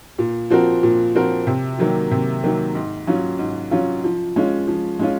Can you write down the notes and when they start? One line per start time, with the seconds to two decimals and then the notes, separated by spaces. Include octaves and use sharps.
0.19 A#2
0.50 F3 C4 F#4 A#4
0.83 A#2
1.15 F3 C4 F#4 A#4
1.47 C3
1.78 D#3 F#3 A#3
2.11 C3
2.44 D#3 F#3 A#3
2.75 G#2
3.07 F#3 C#4 F4
3.39 G#2
3.71 F#3 C#4 F4
4.04 F3
4.36 G#3 C#4 F4
4.68 F3
4.99 G#3 C#4 F4